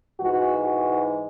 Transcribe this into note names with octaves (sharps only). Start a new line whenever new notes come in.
G#2 E3 G#3 F#4
F#4